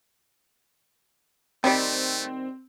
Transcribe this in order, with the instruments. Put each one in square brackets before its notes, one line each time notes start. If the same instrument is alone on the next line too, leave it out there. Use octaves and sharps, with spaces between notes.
[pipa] D#3 G3 [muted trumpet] A3 [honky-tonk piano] C4